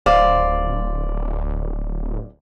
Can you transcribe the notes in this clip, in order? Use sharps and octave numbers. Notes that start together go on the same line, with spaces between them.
D1 C5 D5 F5